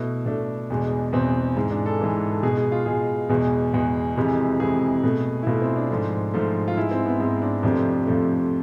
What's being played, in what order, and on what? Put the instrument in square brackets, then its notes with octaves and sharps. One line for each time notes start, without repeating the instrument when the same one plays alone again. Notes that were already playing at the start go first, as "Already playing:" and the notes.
Already playing: [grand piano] B2 A3 E4
B2 A3 D4
E2 B2 G#3
E2 B2 G#3 C4
G#2 E3 G#3
D4
A4
G#2 E3 G#3
A4
B2 G#3 G#4
G#4
F4
B2 G#3 G#4
E2 B2 G#3
E2 B2 G#3
F2 C3 E3 G#3
F2 C3 E3 G#3 G#4
B2 A3
E4
B2 A3 F4
C4
D4
G#2 F3 A3
G#2 F3 A3
F4
G#2 G#3 E4
C4
B3
G#2 G#3 C4
D4
F2 C3 F3 A3 D4
F2 C3 F3 A3